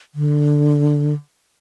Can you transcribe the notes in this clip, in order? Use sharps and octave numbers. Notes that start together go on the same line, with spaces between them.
D3